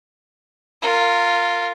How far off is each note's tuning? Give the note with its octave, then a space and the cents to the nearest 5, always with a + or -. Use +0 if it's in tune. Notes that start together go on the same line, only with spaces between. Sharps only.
F4 +0 A#4 -25